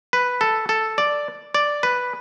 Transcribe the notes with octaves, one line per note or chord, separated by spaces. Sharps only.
B4
A4
A4
D5
D5
B4